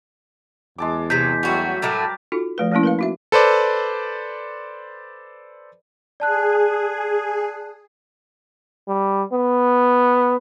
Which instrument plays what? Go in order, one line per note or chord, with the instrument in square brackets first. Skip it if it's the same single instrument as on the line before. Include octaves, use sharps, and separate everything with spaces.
[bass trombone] E2 [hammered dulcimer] G#3 A5 D6
[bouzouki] C3 F#3 [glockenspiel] G6 B6
[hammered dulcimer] F#3 G3 A3 [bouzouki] C#4 F#4
[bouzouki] A2 F#3 A3 [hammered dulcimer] A#4 A5 D6
[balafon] D#4 F4 F#4 A4
F3 A3 B4
F3 A3 A#3 C#4 E4
A#4 B4 F5
D#4 F#4 E5
[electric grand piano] A4 B4 C5 D5
[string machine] G#4 [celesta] D5 A5 F#6
[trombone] G3
B3